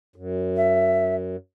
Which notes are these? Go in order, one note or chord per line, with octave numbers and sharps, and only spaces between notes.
F#2
E5